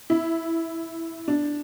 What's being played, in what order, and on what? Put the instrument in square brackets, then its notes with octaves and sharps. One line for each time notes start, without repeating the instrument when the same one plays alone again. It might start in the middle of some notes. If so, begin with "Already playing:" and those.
[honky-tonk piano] E4
D4